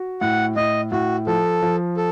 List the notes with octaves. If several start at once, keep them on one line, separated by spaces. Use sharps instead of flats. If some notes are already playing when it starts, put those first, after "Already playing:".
Already playing: F#4
A2 F#5
A2 D#5
A2 F#4
F3 A4
F3
A4